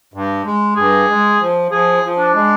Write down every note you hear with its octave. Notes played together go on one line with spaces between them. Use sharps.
G2
G#3
G2 G#4
G#3
F3
F3 G#4
F3
D4
G#3